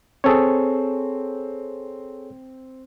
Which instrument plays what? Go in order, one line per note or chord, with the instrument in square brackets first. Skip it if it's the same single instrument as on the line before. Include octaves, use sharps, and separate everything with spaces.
[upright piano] C4 [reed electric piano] G#4 A4 C#5